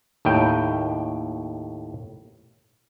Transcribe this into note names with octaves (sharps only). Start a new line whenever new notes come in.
D#2 A2 G5